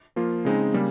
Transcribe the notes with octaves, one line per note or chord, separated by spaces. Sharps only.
F3 A#3 F4
C#3 G#3 C4 D#4
C#3 G3 A#3